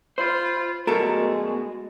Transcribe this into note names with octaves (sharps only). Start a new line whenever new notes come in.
F4 C5 B5
F#2 B2 G#3 A3 F#4 A4 A#4